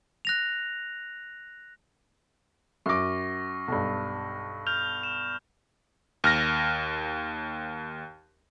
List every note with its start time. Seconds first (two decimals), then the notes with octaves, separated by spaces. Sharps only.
0.25 F#6 A#6 F7
2.86 F#2 C#6 D6 A#6
3.68 B1 G2
4.67 F6 G6 F7
5.03 E7
6.24 D#2 F6 A#6